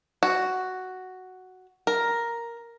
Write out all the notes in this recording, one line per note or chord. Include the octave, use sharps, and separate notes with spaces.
F#4
A#4